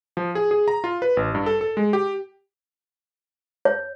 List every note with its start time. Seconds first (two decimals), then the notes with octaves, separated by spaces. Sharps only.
0.17 F3
0.35 G#4
0.51 G#4
0.68 A#5
0.84 F4
1.02 B4
1.17 A1
1.35 G2
1.46 A4
1.61 A4
1.77 G#3
1.93 G4
3.65 C#5